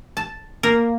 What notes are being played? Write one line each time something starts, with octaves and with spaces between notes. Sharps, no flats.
A5
A#3 A#4